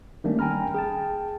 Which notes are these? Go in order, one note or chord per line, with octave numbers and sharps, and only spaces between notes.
D#3 G3 A3 A#3 C#4 D4
G5 G#5 A#5 B5 F6
G#4 G5 A5